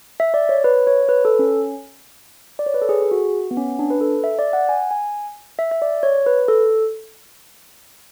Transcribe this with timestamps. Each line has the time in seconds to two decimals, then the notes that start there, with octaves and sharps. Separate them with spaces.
0.20 E5
0.34 D5
0.49 C#5
0.64 B4
0.87 C#5
1.09 B4
1.25 A4
1.39 C#4
2.59 D5
2.66 C#5
2.74 B4
2.82 A4
2.89 G#4
3.02 G#4
3.11 F#4
3.51 B3
3.57 C#4
3.79 D4
3.90 B4
4.01 A4
4.24 E5
4.39 D5
4.53 F#5
4.69 G#5
4.91 G#5
5.59 E5
5.72 E5
5.82 D5
6.03 C#5
6.26 B4
6.48 A4